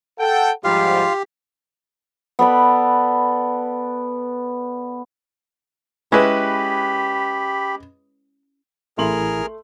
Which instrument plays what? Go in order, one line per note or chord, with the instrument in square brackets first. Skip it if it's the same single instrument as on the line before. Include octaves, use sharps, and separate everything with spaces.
[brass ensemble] A4 F#5 G5
[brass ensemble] G#2 F3 G3 [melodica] F4 F5 [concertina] G4
[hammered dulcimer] B3 A4 D5 B5
[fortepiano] G#3 B4 [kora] C#4 E4 G#4 [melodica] G4 B5
[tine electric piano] A1 E4 [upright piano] A3 C6 F#7 [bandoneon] G#4 A#4 F6